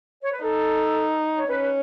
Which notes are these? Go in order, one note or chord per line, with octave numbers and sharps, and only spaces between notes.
C#5
B4
D#4 A4
C#5
C#4 B4